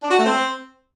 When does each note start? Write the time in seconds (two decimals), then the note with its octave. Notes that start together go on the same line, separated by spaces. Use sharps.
0.02 D4
0.10 F#4
0.18 A3
0.26 C4